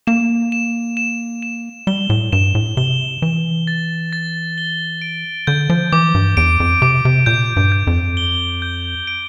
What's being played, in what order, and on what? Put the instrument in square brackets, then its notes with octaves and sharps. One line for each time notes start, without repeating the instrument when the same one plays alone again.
[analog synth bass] A#3 [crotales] E7
[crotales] E7
E7
E7
[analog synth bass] G3 [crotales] G7
[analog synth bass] A2
[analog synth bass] G2 [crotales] E7
[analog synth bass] A2
[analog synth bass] C3 [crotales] G7
[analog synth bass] E3 [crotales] E7
[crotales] A6
A6
G7
D7
[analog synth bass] D3 [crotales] G6
[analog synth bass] F3
[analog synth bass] E3 [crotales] D6
[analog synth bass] G2
[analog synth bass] E2 [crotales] D7
[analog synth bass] F2
[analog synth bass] C3 [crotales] D6
[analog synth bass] C3
[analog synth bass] A#2 [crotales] G6
[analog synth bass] G2
[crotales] G6
[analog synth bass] F2
[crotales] G7
G6
D7